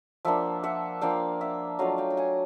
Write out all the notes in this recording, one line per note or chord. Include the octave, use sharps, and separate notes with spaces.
F3 A#3 D4 E5 F#5
E5 F#5
F3 A#3 D4 F5 G5
E5 F#5
F#3 A3 D4 F4 D#5 F5
F5 G5
G5
F#5 G#5